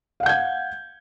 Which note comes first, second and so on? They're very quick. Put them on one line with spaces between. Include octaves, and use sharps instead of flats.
F5 F#5 G6 G#6